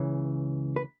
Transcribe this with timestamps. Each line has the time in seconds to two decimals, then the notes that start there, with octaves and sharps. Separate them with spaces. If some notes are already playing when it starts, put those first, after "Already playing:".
Already playing: C#2 C#3 E3
0.76 B4